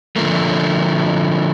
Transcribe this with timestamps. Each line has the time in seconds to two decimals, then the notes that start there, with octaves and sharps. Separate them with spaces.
0.16 D3 F3 A3 A#3